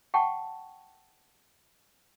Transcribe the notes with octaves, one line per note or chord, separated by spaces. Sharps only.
F#5 G5 A5 C#6